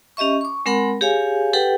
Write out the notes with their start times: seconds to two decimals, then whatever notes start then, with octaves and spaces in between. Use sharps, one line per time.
0.17 C#4 G4 D#5 E5 C#6
0.41 C#6 D6
0.66 G#3 C4 A#4 F#5 B5
1.01 G4 G#4 C#5 F5 G#5
1.53 G4 A4 B4 F#5 G5